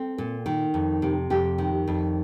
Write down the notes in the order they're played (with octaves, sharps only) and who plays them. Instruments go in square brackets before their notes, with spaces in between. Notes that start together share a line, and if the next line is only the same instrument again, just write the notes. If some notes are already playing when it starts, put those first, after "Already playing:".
Already playing: [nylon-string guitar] C4 A4
A#2
D#3
F2
C3
F2 G4
D#3
F2